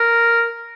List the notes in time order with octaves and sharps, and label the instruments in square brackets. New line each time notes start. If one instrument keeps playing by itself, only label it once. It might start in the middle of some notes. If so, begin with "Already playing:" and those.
Already playing: [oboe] A#4